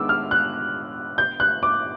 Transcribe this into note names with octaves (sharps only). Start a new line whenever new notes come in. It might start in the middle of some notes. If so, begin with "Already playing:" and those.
Already playing: D#3 G#3 B3 D4 D6 E6
F6
F#6
G6
F#6
D6